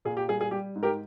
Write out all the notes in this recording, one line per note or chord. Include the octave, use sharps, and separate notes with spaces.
A#2 G#4
G4
G3 G#4
G#4
G3 G4
G#2
G4 A#4